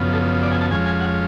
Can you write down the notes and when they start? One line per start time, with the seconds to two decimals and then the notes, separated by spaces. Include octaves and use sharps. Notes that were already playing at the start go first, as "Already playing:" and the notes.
Already playing: F#2 C#3 F3 B3
0.13 A4
0.43 D5
0.52 G#5
0.62 A5
0.71 F2 F3 G#3 C#4 G#5
0.86 G#5
1.00 F#5